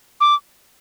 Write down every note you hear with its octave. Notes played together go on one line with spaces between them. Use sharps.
D6